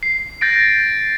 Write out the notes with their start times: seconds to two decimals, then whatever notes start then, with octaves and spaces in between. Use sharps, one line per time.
0.03 C7
0.41 G6 A6 A#6 D7